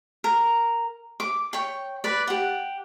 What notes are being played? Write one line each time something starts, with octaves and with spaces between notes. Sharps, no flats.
A#4
D6
C#5 G5
B4 D5
G4 F#5